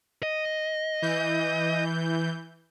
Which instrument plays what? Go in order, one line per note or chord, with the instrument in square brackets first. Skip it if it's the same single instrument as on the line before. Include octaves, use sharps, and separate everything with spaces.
[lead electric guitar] D#5
[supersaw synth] E3 G6